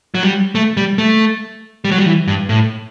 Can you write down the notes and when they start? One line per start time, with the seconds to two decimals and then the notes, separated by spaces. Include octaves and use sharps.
0.15 F#3
0.23 G3
0.55 A3
0.77 G3
0.98 A3
1.85 G3
1.91 F#3
1.98 G3
2.06 E3
2.28 G2
2.49 A2